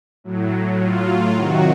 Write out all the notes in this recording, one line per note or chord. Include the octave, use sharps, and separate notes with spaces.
A2 F#3
F4
C3 D#3 F#3 F#4